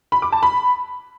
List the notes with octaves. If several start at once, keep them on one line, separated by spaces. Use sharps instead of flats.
B5
D6
A5
B5